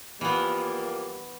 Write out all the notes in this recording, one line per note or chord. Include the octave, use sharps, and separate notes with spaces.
E3 F3 G3 A#3 B3